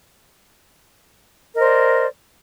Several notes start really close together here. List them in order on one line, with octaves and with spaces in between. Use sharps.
A#4 D#5 C5 D5